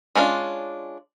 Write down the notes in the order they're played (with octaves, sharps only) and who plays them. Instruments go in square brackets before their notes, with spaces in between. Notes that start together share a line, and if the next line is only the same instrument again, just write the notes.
[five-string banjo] G#3 C#4 D4 F4